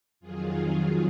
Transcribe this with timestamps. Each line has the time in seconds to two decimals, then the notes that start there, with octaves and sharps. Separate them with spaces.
0.20 F2 D#3 F#3 F4 G#4
0.61 F4 G#4